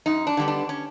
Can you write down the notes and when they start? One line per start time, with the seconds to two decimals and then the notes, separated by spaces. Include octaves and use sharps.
0.06 F#2 D#4
0.27 D4
0.37 D3 G3 B3
0.48 D4
0.69 C#4